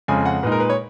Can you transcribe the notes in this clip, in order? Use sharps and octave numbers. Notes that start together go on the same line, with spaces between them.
F2 C#3 G#3 G#5
F#5
A#2 G#3 D#4 B4
A#4
B4
C#5